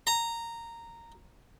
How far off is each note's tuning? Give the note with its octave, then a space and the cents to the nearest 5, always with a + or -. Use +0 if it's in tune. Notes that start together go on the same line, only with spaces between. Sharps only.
A#5 -10